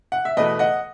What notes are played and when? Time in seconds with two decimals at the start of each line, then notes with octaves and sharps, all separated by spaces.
0.12 F#5
0.25 E5
0.37 E2 B2 A3 B4 D#5
0.59 D#5 F#5